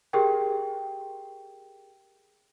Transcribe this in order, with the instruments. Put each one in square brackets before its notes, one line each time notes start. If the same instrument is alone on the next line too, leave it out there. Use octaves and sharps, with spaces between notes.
[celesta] G4 G#4 A#4 G5